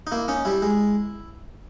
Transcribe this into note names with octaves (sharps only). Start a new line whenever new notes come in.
D#4
A#3 E4
C#4 D#4
G3 E4
G#3